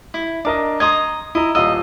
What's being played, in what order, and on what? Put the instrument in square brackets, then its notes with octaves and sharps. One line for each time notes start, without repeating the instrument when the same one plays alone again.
[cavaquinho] E4
[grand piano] D4 A#4 D#5 [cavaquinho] D6
[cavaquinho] D#5 A#5 D#6 [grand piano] C6 G#6
[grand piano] E4 A#5 [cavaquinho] D#5
[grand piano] D#1 F4 E6 [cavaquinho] D#5